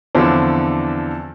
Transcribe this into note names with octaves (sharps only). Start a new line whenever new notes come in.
E2 D3 F3 C4 D4